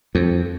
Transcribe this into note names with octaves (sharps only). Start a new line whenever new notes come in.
F2